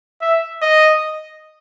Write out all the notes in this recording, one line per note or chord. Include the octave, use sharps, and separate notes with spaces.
E5
D#5